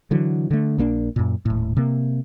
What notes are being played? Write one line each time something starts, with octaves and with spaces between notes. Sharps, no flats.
D3 E3 F#3
D3 A3
A#1 A#3 C#4 D4
F#2 A#2
D#1 A2
C3 A#3